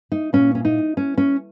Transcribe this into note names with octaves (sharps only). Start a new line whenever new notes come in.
D#4
A#2 C#4
C#4
D#4
C#4
C#4